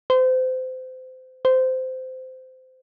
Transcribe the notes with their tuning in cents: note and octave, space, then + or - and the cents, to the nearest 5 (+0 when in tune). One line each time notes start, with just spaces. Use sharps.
C5 -30
C5 -20